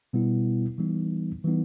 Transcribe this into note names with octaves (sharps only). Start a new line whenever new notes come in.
B2 G3 B3 E4
E3 G3 B3 D#4
E3 G3 B3 D#4